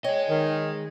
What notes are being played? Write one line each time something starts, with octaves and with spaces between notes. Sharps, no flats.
G#4 C#5 D#5 G5
D#3